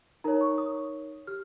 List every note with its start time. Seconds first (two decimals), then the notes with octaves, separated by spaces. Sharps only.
0.24 D#4 A#4 C#5 A#5
0.41 C#6
0.58 D#6
1.27 G4 F6